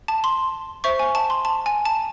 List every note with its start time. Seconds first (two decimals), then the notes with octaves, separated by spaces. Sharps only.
0.08 A5
0.24 C6
0.84 C5 E5 C#6
0.99 G#5
1.15 A5
1.30 C6
1.45 A5
1.66 G#5
1.85 A5